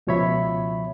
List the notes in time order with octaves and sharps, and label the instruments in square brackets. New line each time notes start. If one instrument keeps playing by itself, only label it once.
[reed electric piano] C#2 B2 F3 C#5 E5 B5